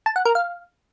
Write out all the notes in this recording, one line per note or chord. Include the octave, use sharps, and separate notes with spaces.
A5
F#5
A#4
F5